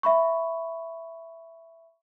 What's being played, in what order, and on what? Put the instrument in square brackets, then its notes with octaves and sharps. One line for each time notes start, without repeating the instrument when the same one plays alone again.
[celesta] E5 B5 C#6